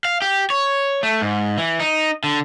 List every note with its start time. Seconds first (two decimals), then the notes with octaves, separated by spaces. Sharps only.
0.05 F5
0.22 G4
0.50 C#5
1.03 A3
1.22 G#2
1.57 E3
1.80 D#4
2.24 D3